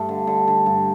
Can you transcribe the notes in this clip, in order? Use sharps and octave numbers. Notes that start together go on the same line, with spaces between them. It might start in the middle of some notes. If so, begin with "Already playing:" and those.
Already playing: G2 A3
D3
D3
D3
G2